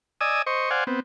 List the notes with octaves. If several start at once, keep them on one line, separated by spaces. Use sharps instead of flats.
D5 D#5 G#5 D#6 E6
C5 D#5 C#6
C5 D5 F5 F#5 G#5
B3 C4